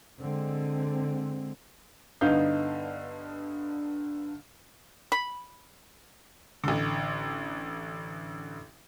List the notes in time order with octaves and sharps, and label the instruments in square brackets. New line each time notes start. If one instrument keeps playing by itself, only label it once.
[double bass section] D3 G#3 C4
[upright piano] G2 D3 B3 D#4 F5 G6
[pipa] B5
[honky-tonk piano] A1 D3